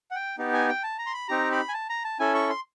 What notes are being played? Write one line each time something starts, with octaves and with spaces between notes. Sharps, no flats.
F#5
G5
B3 D#4 G4
G#5
G5
A5
A#5
C6
B5
C4 D#4 G4 A#5
B5
G#5
A5
A#5
A5
C#4 E4 A4 G#5
C#6
C6